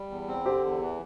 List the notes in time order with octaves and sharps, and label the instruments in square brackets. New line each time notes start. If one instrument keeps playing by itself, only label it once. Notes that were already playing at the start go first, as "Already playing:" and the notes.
Already playing: [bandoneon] G3
E2
C4
[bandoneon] D3 [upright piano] G4 C5
[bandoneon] E2
E3